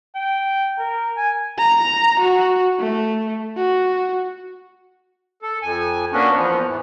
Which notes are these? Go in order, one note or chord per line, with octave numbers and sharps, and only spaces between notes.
G5
A#4
G#5
A#5
F#4
A3
F#4
A4
F2 G#5
A#3 B3 C#4 D4 F#4
E2 F3 B3
G#2 E3